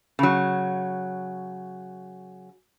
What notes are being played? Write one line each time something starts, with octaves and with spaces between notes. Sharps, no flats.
C#3 F#3